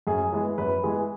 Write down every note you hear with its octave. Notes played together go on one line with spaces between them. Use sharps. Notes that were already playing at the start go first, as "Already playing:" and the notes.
F#2 G#4
E3 G#3 B3
F#2 B4
E3 G#3 B3 G#4